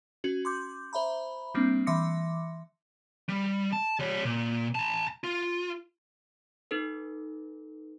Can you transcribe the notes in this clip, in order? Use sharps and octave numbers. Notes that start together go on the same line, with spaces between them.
C#4 F#4
C6 D6 G6
C5 E5 A#5 B5
G3 A#3 C4 D4
E3 E5 C6 D6 A#6 C#7
G3
A5
G3 C#5
A#2
A5 A#5
F4
D#4 A4 B4